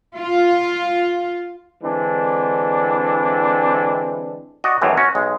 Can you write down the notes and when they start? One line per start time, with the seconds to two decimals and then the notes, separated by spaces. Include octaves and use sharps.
0.17 F4
1.83 D3 E3 G#3 C4 D4 E4
4.64 F#4 D5 D#5
4.82 G#1 F#2 A2 D#3 E3
4.97 C#4 F#4
5.15 B1 G#3